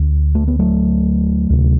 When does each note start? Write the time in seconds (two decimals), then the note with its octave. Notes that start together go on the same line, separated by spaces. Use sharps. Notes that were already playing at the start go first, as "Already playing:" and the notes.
Already playing: D2 D3
0.35 A3
0.48 B3
0.59 F#3 A3
1.50 D2 C3